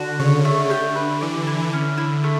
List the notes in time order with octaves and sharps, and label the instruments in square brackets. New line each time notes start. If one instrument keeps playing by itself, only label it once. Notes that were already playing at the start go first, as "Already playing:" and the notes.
Already playing: [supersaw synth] D3 [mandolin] F#4
[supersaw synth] C#3 [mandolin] C#5
[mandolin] A3
[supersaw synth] D3 [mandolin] G4
[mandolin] B4
[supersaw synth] E3 [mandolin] D5
[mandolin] E4
[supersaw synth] D3 [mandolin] C#4
[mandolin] E4
A3